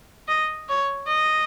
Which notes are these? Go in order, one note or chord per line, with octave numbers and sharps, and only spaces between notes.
D#5
C#5
D#5